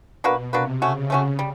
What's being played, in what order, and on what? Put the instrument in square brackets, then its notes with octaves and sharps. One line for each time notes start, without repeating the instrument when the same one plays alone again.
[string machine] B2 [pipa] A#3 D4 F#4 B4
[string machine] C3 [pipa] A#3 D4 F#4 B4
[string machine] C#3 [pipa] A3 C#4 F#4
[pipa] A3 C#4 F#4
G3